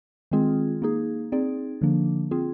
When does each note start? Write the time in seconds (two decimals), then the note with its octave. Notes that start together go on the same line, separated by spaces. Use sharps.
0.31 D#3 G#3 C4 F4 G#4
0.82 A#3 D#4 G#4
1.32 C4 D#4 G#4 D5
1.81 D3 F3 A#3 D4
2.31 C4 F4 G#4